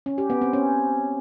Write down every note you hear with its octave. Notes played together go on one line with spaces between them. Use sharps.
C#4
G4
B3
C4
C#4